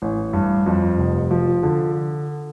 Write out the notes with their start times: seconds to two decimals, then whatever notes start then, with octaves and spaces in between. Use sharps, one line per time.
0.02 A1
0.33 G2
0.66 F2
0.98 F1
1.31 F3
1.63 D3